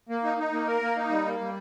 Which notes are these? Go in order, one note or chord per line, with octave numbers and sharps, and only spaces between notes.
A#3
D#4
D#4
A#3
A#4
A#3
D#4
G3
A#3
G3